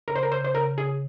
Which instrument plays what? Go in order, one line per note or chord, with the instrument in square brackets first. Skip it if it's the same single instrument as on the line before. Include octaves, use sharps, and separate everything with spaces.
[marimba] C#3 [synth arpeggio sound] A#4
[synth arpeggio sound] C5
A#4
[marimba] C#3 [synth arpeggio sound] C5
[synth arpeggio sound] C5
[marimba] C#3 [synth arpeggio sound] A#4
[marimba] C#3 [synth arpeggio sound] G#4